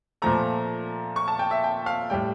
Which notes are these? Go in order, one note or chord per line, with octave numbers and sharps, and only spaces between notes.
A#2 F3 A3 A#5
C#6
A5
G5
E5
G5
F5
A2 G3 G5